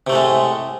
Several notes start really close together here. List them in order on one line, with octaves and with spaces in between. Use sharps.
C3 A3 A2 G#3